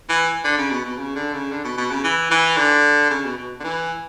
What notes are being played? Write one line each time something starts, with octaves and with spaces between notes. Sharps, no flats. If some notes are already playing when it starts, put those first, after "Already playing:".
E3
D3
C#3
B2
B2
C#3
D3
C#3
D3
B2
B2
C#3
E3
E3
D3
C#3
B2
B2
D3
E3